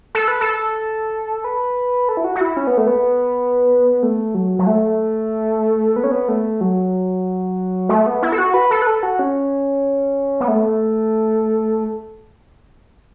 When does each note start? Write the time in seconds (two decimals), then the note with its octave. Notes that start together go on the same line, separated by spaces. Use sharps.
0.15 A4
0.28 B4
0.41 A4
1.44 B4
2.09 A4
2.17 E4
2.24 F#4
2.35 F#4
2.41 E4
2.57 C#4
2.67 B3
2.78 A3
2.87 B3
4.03 A3
4.35 F#3
4.59 F#3
4.67 A3
5.96 B3
6.04 C#4
6.11 B3
6.28 A3
6.61 F#3
7.89 A3
8.06 B3
8.23 E4
8.32 A4
8.38 F#4
8.54 B4
8.71 A4
8.82 B4
8.87 A4
9.03 F#4
9.19 C#4
10.40 B3
10.48 A3